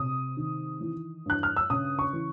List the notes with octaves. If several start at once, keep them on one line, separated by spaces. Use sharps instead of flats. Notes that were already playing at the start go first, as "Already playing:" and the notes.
Already playing: C3 D#6
D#3
E3
G2 F#6
F6
E6
C#3 D#6
C#6
E3